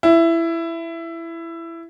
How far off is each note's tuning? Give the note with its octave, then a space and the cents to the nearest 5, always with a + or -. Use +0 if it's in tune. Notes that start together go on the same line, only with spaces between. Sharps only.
E4 +15